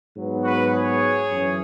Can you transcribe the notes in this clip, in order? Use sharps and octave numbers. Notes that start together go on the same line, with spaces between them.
G#2 F#3 B3
F#4 B4
G#4 C#5
F#2 E3 C#4